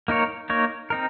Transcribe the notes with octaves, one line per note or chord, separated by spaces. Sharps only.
A#3 D#4 A#4 C#5
A#3 D#4 A#4 C#5
C4 D#4 A#4